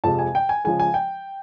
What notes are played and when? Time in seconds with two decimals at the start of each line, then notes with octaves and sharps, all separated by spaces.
0.04 F2 C3 F3 G#3 A5
0.19 G#5
0.35 G5
0.49 G#5
0.64 C#3 F3 G#3 G#5
0.80 G#5
0.94 G5